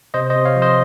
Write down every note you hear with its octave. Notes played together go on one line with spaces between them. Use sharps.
C3 C5 D#5
C5 D#5
C3
C#5 F5
F3
C5 D#5